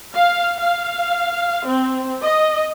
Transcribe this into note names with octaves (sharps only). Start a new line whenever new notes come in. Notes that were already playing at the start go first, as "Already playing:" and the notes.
F5
F5
C4
D#5